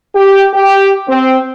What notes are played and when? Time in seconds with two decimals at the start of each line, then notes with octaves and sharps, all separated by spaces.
0.15 G4
0.53 G4
1.08 C4